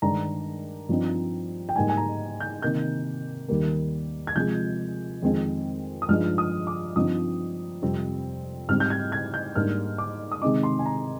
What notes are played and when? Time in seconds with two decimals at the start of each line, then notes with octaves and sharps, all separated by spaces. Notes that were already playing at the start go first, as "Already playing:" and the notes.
0.02 G2 D#3 G#3 D4 A#5
0.89 G2 F3 C4 D#4
1.69 G5
1.76 G#2 G3 A#3 D#4 G#5
1.89 G#5
1.97 A#5
2.40 G6
2.62 C3 D#3 A#3 D#4 G6
3.48 D#2 D#3 G3 A#3
4.27 G#6
4.36 C3 F3 G#3 G6
5.22 F2 D#3 G#3 C4
6.02 D#6
6.09 G2 F3 G#3 D#4 F6
6.38 D#6
6.67 D6
6.96 G2 F3 C4 D#4 D#6
7.82 F2 C3 G3 C4
8.69 G#2 G3 C4 F6
8.80 G6
8.90 G#6
9.12 G#6
9.34 G6
9.55 G#2 G3 A#3 D4 F6
9.98 D6
10.32 D#6
10.42 C3 D#3 G#3 C4 D#4 D6
10.63 C6
10.79 G#5
10.86 A#5